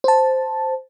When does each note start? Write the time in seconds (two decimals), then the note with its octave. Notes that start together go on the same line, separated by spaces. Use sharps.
0.04 C5 A5